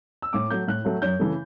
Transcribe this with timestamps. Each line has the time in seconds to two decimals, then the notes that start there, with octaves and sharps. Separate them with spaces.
0.22 E6
0.33 A2 D6
0.50 F#3 A3 G6
0.68 A2 F#6
0.85 F#3 A3
1.02 F#2 G6
1.19 C#3 E3 A3